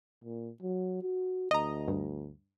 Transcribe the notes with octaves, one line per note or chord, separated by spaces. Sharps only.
A#2
F#3
F#4
D2 D#5 A#5
G2